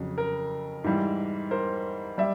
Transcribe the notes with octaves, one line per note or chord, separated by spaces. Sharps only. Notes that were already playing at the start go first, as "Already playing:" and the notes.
Already playing: F2 C#3 F#3
A#4
G#2 E3 G3
A#4 C5
G3 D5 E5